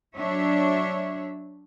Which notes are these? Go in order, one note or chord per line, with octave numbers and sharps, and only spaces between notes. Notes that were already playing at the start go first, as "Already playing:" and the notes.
F#3 D4 C#5 E5